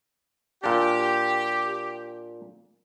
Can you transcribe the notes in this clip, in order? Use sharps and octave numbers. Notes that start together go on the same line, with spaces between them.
A#2 D4 G4